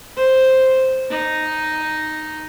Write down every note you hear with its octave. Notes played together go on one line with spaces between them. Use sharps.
C5
D#4